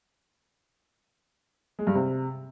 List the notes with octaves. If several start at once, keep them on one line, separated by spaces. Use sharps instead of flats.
G#3
G2
C3